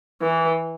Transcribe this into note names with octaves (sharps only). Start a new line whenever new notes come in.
E3